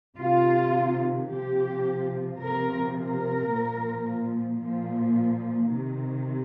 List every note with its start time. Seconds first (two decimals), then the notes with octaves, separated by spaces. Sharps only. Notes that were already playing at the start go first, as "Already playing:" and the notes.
0.17 C3 D#3 F4
1.27 C3 F3 G4
2.37 C3 F3 A#4
2.93 A#4
3.48 A#2 F3
4.59 A#2 F3
5.69 C3 D#3